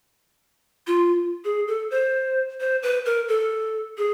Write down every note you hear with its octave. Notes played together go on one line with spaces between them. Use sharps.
F4
G#4
A4
C5
C5
B4
A#4
A4
G#4